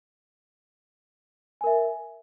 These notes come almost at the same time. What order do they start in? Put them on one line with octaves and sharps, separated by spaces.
G#5 A#4 E5